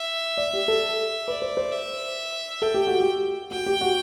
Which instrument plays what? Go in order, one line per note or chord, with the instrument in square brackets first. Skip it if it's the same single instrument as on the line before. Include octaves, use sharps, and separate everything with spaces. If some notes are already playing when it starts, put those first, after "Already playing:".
Already playing: [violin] E5
[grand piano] D5
G4
A4
[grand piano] B4 [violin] D5
[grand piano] C5
C5
[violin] E5
[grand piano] A4 [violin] G5
[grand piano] G4
F#4
G4
[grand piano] F#4 [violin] G5
[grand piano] G4
F#4